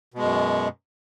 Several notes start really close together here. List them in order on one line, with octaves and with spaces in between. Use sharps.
B2 G#3 F#2